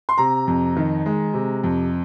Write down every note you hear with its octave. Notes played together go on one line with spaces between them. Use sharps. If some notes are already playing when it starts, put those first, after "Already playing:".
C6
C3 A#5
F2
D#3
G#3
C3
F2